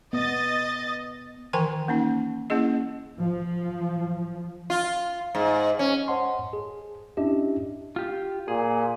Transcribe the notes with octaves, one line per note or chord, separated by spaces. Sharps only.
B3 D#5 A6
D#3 E3 A#4 G5 G#5 C6
A#3 C#4 D#4
A#3 C#4 E4 G#4 D#5
F3
F4
G#2
C#4
C5 C#5 D#5 F#5 A5 C6
G#4
C#4 D4 E4 G4 D#5 E5
F4 G4
A#2 G#4